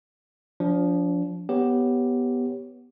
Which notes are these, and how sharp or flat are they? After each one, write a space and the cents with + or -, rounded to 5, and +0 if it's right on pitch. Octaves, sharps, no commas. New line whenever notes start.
F3 +15 D4 -30
B3 -5 G4 +0 C#5 +0